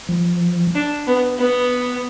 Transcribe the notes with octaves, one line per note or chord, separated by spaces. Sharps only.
F3
D4
B3
B3